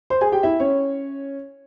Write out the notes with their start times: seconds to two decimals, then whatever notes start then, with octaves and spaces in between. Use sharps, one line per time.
0.10 C5 C6
0.21 G#4 G#5
0.32 G4 G5
0.43 E4 E5
0.60 C#4 C#5